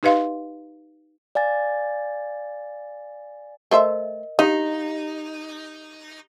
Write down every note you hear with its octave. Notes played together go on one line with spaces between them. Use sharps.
D#4 G4 B4 D#5 F5 C6
D5 F5 G#5 A6
A3 A#4 C5 D#5 E5
D#4 G4 D#5 F5